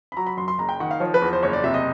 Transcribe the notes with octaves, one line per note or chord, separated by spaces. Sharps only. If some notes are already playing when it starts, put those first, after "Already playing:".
B5
F#3 A#5
B5
F#2 C6
C6
F#1 A#5
G5
D#3 F#5
F5
F3 C#5
B4
E2
C5
F#1 C#5
D5
C3 E5
D#5